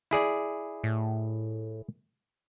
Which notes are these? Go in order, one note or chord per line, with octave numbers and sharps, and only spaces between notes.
E4 G#4 D5
A2